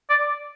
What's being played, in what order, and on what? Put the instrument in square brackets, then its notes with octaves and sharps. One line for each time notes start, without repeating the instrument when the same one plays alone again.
[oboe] D5